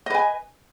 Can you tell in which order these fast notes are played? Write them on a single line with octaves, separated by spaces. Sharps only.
D#5 B4 G#5